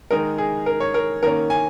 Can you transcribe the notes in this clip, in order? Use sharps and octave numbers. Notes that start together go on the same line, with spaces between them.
D#3 G#3 D#4 A#4
G#4
A#4
C#5
A#4
D#3 A#3 C#4 A#4
G#5